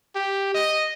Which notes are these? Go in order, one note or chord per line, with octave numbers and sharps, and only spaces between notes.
G4
D#5